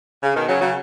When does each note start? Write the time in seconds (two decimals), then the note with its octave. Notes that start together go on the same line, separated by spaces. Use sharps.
0.23 C#3
0.36 B2 D#3
0.48 C#3 F#3
0.61 C#3 F#3